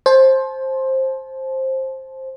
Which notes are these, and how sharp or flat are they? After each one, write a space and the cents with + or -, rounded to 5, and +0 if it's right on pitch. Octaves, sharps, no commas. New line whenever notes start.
C5 +15 A5 -30